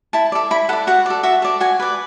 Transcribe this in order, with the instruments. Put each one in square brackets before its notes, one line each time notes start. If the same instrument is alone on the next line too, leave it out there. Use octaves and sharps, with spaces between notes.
[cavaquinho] E4 A5
A4 D5
E4 B5
A4 F#5
D5
F#4 F#5
A4 D5
F#4 E5
A4 D5
F#4 G#5
B4 D5